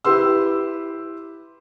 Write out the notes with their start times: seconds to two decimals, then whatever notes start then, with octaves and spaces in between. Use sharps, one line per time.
0.04 E4 G4 B4 C6 E6